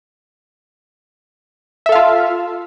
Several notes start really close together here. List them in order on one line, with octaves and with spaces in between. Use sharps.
E5 A4 F5 F4